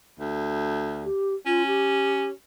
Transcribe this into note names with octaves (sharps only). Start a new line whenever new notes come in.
D2
G4
C#4 F4
G4